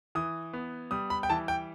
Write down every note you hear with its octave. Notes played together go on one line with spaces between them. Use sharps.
E3 D#6
B3
G3 D#6
B5
G5
E3 A5
G5